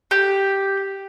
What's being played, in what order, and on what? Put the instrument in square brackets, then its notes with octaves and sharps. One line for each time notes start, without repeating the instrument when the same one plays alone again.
[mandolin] G4